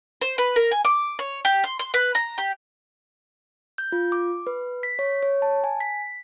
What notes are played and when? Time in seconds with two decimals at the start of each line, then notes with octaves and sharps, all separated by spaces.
0.21 C5
0.38 B4
0.56 A#4
0.71 G#5
0.85 D6
1.19 C#5
1.45 G4
1.64 C6
1.79 C6
1.94 B4
2.15 A#5
2.38 G4
3.78 G6
3.92 F4
4.12 D6
4.47 B4
4.83 B6
4.99 C#5
5.23 C#5
5.42 A5
5.64 G#5
5.80 B6